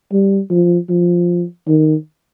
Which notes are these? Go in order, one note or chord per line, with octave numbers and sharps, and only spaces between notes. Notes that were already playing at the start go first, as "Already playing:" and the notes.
G3
F3
F3
D#3